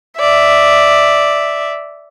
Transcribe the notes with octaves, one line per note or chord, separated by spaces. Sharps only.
D5 E5